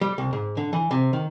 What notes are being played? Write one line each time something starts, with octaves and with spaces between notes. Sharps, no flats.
G3
C2
G#2
D3
E3
C3
D#3